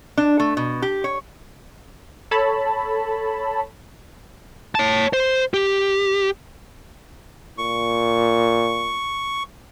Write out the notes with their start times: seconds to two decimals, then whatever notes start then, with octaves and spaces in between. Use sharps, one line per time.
0.17 D4
0.40 A3
0.57 B2
0.82 G4
1.04 C#5
2.31 A4 C#5 A5 B5
4.75 C#5 A5
5.13 C5
5.54 G4
7.58 A#2 C#6